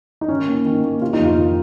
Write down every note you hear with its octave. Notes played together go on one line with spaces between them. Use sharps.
D#4
D#3 C#4
A#3
D#3
A#3
C3 F4
D#4
F2
F4
D#3